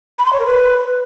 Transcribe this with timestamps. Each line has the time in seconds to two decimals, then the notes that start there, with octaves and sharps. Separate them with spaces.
0.19 B5
0.26 C6
0.33 C#5
0.40 A#4
0.47 B4